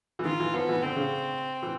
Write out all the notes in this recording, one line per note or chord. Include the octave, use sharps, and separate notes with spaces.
E3
D#3 F4
E3
F3 B3
E3
D3 C4
C#3
E3